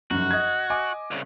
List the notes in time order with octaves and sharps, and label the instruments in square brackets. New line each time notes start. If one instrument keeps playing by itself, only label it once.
[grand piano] F1 F#2 [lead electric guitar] F#4
[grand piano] D#5 G#6
D#5 G#5 D6
[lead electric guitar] C2 C#3